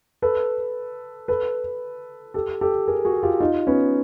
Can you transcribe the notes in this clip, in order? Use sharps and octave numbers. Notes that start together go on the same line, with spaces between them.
A4 B4
A4 B4
G4 A4
G4 A4
G#4 A#4
F#4 G#4
F4 G4
D#4 F4
B3 C#4